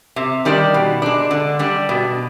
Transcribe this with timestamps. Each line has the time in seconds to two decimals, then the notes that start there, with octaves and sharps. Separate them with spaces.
0.16 C3
0.45 D#3 G3 D4
0.74 B2
1.02 G#3 D4
1.31 D3
1.59 G3 D4
1.89 B2